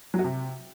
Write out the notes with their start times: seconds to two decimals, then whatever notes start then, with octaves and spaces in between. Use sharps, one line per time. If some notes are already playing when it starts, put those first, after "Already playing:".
0.14 F#3
0.19 F#4
0.24 C3